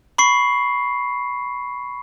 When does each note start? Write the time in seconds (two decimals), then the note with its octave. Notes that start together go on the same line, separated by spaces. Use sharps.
0.18 B5 C#6 C7